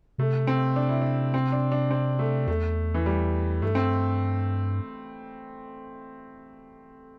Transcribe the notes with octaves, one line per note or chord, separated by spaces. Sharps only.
C3 A3
C4
D4
E4
D4
C4
D4
D4
C4
A3
E2 A3
E3
G3
G2 A3
C4